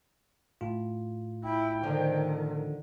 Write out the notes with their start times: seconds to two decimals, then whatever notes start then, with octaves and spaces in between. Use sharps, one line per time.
0.61 A2 F4
1.44 E4 G5
1.83 D3 D#3 F3 C#4